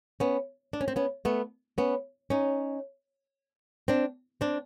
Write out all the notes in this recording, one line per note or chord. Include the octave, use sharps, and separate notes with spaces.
B3 C#4
D4
C#4
C4
B3 C#4
A3 B3
B3 C#4
C#4 D#4
C4 D4
C4 D4